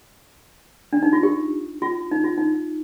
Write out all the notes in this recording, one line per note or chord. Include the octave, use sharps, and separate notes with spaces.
D4
D#4
F4
G4
F4
D#4
F4
D#4